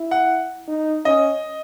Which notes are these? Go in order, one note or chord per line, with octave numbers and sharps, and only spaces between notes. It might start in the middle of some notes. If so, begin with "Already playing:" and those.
Already playing: E4
F#5
D#4
C#4 D#5